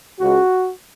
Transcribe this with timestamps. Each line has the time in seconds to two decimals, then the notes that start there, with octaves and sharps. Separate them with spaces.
0.19 C#2 C#3 G#3 F#4